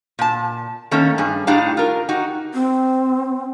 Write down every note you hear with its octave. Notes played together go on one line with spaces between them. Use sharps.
A#2 A5
D#3 A3 A#3 C#4
G2 G#4
A2 D4 D#4 G4 F5
F4 A#4
D#4 F#4 G4
C4